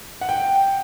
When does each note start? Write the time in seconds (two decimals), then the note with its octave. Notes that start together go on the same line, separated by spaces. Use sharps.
0.21 F#5
0.29 G5